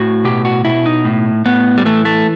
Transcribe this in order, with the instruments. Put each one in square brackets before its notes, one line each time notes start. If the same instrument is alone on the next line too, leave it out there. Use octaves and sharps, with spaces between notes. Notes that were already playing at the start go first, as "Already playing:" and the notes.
Already playing: [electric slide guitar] A2 F#4
B2 G4
F#4
B2 E4
D#4
A2
A2 B3
G3
E3 A3
A3